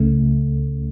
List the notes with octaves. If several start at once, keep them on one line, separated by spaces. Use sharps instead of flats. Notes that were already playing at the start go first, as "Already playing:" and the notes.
Already playing: C#2 C#3 A3